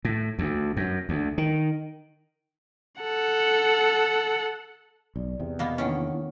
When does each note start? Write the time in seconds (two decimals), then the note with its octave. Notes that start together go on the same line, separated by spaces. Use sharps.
0.05 A2
0.39 D2
0.77 F#2
1.09 D2
1.38 D#3
3.02 A4 F#5
5.16 B1 D5
5.40 E2 C3
5.59 B2 A#3 B3
5.78 D3 D#3 A#3 B3 C#4 E4